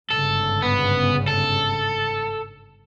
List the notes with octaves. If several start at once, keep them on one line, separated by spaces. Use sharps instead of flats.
G1 G#2 C#3 A4
B3
A4